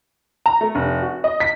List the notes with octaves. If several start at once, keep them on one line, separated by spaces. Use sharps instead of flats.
A#5
A3
F1
F#4
D#5
B6